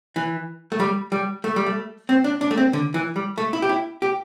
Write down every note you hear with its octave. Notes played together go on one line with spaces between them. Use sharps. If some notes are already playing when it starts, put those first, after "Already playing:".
E3
A3
G3
G3
A3
G3
A3
C4
D4
D4
A3
C4
D3
E3
G3
A3
E4
G4
E4
G4